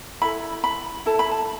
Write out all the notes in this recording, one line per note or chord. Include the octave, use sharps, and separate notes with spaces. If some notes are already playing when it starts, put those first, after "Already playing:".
E4 A4 B5
B5
E4 A4 A5
B5
A5